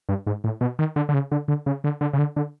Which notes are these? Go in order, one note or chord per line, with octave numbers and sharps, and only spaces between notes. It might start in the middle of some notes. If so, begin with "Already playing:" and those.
G2
G#2
A2
B2
D#3
D3
D3
C#3
D3
D3
C#3
D3
D3
C#3
D3
D3